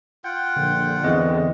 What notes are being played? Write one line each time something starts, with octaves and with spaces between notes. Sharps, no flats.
F4 F#5 G5 G6
A#1 D3
E2 C4 G#4 D#5